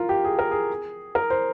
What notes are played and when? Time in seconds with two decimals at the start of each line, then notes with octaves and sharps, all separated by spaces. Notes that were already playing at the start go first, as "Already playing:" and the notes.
Already playing: F4 A#4
0.09 G4
0.24 G#4
0.39 A#4
0.51 G#4
1.15 A#4
1.30 C5